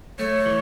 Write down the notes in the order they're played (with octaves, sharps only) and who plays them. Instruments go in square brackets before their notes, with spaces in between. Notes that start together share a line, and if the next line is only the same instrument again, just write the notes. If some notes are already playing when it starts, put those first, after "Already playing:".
[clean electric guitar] A3 [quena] C#5
[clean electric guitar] E3